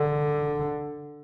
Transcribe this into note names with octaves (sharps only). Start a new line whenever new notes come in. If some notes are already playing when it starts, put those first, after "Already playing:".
Already playing: D3